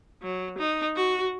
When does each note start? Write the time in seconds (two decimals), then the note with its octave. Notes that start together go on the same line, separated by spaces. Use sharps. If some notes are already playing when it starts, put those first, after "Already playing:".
0.22 F#3
0.58 D#4
0.96 F#4